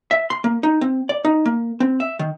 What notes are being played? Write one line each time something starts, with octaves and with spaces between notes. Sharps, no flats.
E5
C6
A#3
D#4
C4
D5
D#4
A#3
C4
E5
D#3